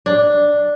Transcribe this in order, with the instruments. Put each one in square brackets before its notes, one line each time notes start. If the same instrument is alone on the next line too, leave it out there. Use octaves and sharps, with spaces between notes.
[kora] D4